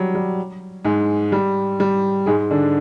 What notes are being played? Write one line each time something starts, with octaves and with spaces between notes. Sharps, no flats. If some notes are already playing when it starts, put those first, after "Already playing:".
Already playing: F#3 G3
G3
G#2 G#3
G3
G3
G#2 G#3
D3 D4